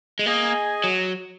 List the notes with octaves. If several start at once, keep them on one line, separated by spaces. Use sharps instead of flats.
G#3
A#3 G#4 D#5 G#5
F#3